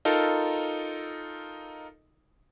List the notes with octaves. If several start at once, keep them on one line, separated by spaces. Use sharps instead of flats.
D#4 F4 A4 A#4